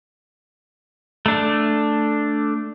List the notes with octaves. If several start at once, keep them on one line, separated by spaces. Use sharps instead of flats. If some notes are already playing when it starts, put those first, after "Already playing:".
A3 D4